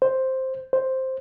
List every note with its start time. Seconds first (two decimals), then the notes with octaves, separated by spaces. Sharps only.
0.02 C5
0.73 C5